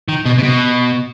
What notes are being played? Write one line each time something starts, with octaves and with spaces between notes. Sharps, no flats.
D#3
B2
C3
B2